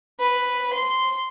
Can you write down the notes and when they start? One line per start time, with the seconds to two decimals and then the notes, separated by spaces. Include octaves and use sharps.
0.19 B4
0.73 C6